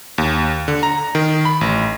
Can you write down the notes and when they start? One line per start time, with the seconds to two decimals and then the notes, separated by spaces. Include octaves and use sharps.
0.18 D#2
0.68 D3
0.83 A#5
1.15 D#3
1.45 B5
1.61 A1